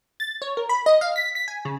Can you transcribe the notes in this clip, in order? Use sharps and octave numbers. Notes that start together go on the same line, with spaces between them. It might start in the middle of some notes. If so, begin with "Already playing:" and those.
A6
C#5
A#4
B5
D#5
F5
B6
B6
G#5
C#3